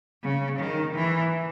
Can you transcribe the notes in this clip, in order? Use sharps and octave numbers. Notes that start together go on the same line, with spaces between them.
C#3
D#3
E3